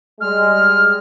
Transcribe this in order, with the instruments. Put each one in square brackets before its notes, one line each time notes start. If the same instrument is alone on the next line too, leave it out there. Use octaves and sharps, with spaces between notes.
[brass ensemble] G3 G#3 [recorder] F6